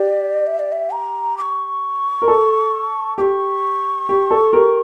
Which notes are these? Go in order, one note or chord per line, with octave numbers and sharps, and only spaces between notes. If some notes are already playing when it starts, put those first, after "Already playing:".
Already playing: G4 D5
E5
D5
E5
A#5
D6
C#6
A#4
A4
G4 C#6 D6
G4
A4
G4 A#4